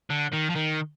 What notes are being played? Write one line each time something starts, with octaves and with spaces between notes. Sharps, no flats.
D3
D#3
F3
D#3